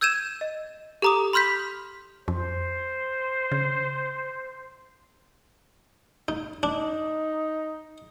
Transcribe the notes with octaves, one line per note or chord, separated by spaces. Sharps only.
E6 G6 G#6 D#7 E7
D#5
G4 A4 A#5 D6 D#6
B5 C6 F6 G6 B6
F2 C5
C#3
D#4
D4 D#4